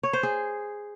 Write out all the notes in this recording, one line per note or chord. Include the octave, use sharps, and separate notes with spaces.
C#5
C5
G#4